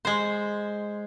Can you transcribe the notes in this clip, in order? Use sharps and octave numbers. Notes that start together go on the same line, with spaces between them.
G#3 C5